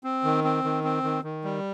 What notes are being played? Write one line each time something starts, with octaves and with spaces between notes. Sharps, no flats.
C4
D#3
C4
D#3
C4
D#3
D#3
G3